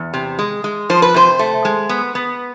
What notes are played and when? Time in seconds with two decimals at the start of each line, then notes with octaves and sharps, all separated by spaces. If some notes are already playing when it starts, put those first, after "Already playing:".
Already playing: E2
0.14 C3
0.39 G#3
0.64 G#3
0.90 F3 C5
1.02 B4
1.14 C3 C5
1.39 A3
1.65 G#3
1.89 B3
2.15 B3